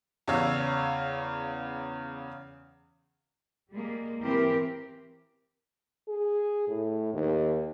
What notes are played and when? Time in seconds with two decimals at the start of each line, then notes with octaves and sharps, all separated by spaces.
0.28 E2 C#3 C#5 F5 E6
3.71 G3 G#3 A#3
4.22 E3 C4 G4 A#4
6.08 G#4
6.68 A2
7.13 D#2